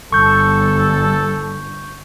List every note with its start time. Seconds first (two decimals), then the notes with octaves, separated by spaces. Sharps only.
0.12 G1 A4 C#6 G6